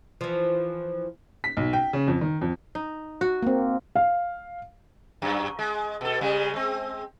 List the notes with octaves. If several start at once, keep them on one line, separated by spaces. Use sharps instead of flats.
E3 F3
B6
B1
G5
C#3
F2
D#3
F2
D#4
F#4
A#3 C4
F5
F#2
G#3
B2 A4
C#3 G3 G#3
G#3 C4